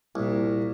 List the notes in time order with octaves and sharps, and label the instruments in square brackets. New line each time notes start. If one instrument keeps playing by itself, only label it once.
[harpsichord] C2 [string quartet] A#2